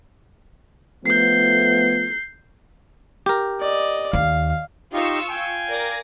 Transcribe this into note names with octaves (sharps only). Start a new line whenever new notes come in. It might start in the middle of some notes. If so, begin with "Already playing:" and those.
F3 A3 B3 G6 C7
G4 A#4
D5 D#5
D#2 F5
D#4 F4 G4 D#5 F5 C#6 E6
F5 G5 G#5
A#4 D5 A#6